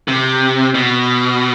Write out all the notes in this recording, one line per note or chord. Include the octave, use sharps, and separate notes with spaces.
C3
B2